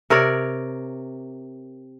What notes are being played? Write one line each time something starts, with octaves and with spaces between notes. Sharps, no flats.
C3 A#4 C#5 D5